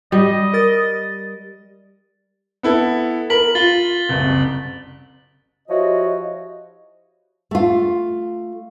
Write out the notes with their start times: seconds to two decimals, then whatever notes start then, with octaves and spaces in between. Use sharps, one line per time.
0.12 G3 D#5
0.53 A#4 A6
2.63 B3 E4 A4
3.30 A#4 B5 B6 F#7
3.55 F4 A6 G7
4.09 F#1 C2
5.68 F3 E4 F#4 G4 C#5 D#5
7.51 A3 F4